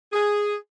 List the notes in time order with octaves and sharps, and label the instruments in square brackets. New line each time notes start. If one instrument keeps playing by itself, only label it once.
[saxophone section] G#4